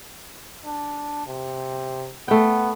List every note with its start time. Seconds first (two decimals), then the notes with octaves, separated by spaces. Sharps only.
0.65 D4
1.26 C3
2.28 A3 B3 G5